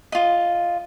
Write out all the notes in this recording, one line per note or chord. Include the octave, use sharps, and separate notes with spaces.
F4 D#5